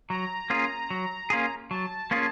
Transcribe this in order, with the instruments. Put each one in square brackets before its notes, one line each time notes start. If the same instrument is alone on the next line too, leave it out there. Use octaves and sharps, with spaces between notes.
[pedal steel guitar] F#3 [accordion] A#5
[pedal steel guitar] A#3 C#4 F4 G#4
F#3
A#3 C#4 F4 G#4
[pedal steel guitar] F#3 [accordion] A5
[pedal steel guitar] A#3 C#4 F4 G#4